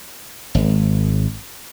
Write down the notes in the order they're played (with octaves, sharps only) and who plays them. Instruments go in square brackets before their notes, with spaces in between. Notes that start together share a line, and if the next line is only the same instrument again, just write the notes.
[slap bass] G#1